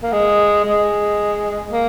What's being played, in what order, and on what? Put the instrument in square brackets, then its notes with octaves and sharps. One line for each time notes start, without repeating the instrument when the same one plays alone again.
[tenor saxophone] A#3
G#3
G#3
A#3